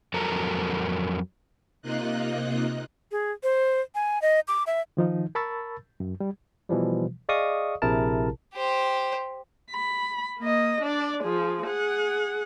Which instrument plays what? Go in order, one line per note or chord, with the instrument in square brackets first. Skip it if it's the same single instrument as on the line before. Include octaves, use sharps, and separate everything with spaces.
[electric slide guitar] F2 F#3 A4 A#4 A5 A#5
[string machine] C3 A#3 D#4 F4 D#5 F#6
[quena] G#4
C5
G#5
D#5
D6
E5
[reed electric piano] D#3 F3 D#4
A#4 A5 B5 C#6 E6 A6
F#2
G3
[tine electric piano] B2 E3 F3 G3
G#4 D5 D#5 F5 C#6 D#6
A#1 C3 E4 G#4 A#4 A5
[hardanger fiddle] G4 C5
[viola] B5
A#3 D#5
D4 D5
F3 G#4
G#4 F#5